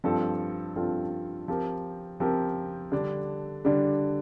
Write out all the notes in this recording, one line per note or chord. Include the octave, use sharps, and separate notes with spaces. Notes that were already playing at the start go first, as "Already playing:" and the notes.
G2 F3 C4 F4 A4
G2 F3 C4 F4 A4
F3 C4 G4 A#4
F3 C4 G4 A#4
D3 G3 D4
D3 G3 D4